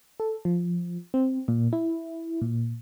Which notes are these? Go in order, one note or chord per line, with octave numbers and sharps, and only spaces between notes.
A4
F3
C4
A#2
E4
A#2